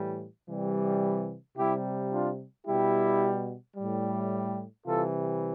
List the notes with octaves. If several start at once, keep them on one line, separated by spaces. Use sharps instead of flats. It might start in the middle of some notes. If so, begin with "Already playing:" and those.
Already playing: A2 E3 G3
C3 E3 G3
C3 G3 E4 G4
D4 F4
B2 G3 E4 G4
A2 G3
C3 E3 G3 F4 A4